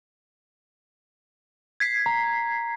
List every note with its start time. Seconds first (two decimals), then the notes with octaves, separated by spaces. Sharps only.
1.80 G#6 B6 C7
2.06 A#5